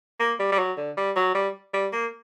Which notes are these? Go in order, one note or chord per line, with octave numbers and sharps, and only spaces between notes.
A#3
G3
G3
F#3
D3
G3
F#3
G3
G3
A#3